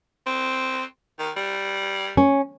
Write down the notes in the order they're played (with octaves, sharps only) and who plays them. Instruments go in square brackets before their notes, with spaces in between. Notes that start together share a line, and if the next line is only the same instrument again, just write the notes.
[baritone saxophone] C4
D#3
G3
[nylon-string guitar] C#4